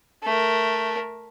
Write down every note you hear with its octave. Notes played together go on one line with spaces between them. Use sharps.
A3 A#4